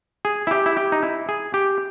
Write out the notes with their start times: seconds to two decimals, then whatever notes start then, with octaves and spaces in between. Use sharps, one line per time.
0.25 G#4
0.47 E4
0.51 G4
0.66 E4
0.77 G4
0.92 D#4
1.03 E4
1.29 G#4
1.54 G4